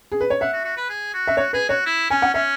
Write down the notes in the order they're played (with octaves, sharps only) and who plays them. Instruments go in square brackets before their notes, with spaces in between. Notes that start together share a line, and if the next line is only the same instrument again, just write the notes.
[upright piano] G#4
B4
C#5
[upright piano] E5 [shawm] F#5
[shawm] F#4
F#4
B4
G#4
F#4
[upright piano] E5
[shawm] F#4 [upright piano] C#5
[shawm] G#4 [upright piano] B4
[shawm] F#4 [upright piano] C#5
[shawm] E4
[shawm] C#4 [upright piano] G#5
[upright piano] F#5
[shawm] C#4 [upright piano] E5